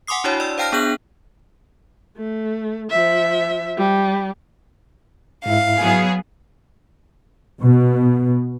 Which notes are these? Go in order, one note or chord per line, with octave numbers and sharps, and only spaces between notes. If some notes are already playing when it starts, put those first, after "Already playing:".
F#5 G#5 C6 D6 D#6 C7
D4 E4 F#4 C#5
D5 E6
C5 F5 G5 A5 F6 A#6
B3 D4 G#4 F#6 G6 F#7
A3
F3 E5
G3
G#2 E4 E5 F5
F#3 B3 G#4
B2